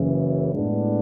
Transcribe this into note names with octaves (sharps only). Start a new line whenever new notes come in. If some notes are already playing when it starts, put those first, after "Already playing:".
Already playing: F#1 F#2 C#3 E3
A2 G#3 B3 D4